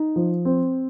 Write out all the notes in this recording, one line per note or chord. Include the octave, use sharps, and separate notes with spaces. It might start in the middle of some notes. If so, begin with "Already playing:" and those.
Already playing: D#4
F3
C4